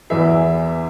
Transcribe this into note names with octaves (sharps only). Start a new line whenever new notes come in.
E2 E3 E5